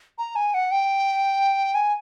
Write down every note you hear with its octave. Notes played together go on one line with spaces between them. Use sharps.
A#5
G#5
F#5
G5
G#5